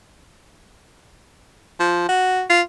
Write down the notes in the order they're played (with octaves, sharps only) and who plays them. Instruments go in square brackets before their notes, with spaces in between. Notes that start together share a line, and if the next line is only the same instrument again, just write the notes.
[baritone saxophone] F3
F#4
F4